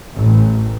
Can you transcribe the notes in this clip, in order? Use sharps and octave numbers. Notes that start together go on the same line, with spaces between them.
A1